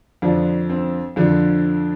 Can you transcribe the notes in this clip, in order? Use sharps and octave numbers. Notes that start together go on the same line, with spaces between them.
F2 D3 F3 D4
C4
F2 D3 F3 D4